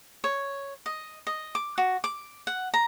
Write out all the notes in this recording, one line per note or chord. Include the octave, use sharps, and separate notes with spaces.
C#5
D#5
D#5
D6
F#4
D6
F#5
A#5